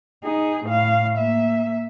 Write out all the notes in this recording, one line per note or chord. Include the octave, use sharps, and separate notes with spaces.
D#4 G#4
A2 F5
A#3 E5